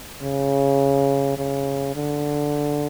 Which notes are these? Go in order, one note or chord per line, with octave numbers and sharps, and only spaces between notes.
C#3
C#3
D3